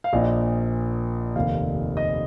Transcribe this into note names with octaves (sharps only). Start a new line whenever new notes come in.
F5
A#1 A#2 D#5
F1 D#2 D#3 F5
D#5